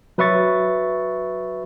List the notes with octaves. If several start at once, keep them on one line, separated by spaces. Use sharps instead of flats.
F#3 B4 E5 C#6 A6